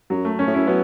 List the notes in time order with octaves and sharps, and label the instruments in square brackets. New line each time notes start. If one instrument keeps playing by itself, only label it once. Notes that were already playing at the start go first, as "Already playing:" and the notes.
[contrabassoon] F#2 [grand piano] F#3
[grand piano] A3
[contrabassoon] F#2 [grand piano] C#4
[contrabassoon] A2
[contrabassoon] F#2 [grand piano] E4
[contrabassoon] F#3 [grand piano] B3